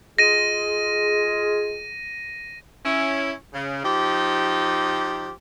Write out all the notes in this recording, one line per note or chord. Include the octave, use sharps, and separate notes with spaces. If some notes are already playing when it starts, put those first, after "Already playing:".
G#3 F4 G#4 A#6 D#7
C#4 E4
C#3
F3 D#4 G4